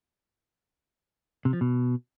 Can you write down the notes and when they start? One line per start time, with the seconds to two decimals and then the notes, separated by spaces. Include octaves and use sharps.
1.45 C3
1.53 F3
1.61 B2